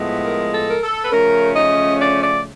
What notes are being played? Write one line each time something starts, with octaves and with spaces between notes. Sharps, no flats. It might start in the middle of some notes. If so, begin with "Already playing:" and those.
Already playing: A2 F3 G#3 B3
A#4
A4
A#4
A4
B4
C#3 F3 A3 C#4 A#4
D#5
D5
D5